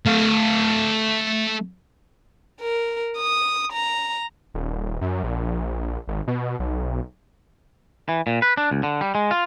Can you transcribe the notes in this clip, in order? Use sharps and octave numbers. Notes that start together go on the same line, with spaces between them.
A3 F5
A#4
D#6
A#5
D#1
F#2
A#1
G#1
B2
B1
E3
A#2
B4
D4
C#2
D3
G3
G#3
F4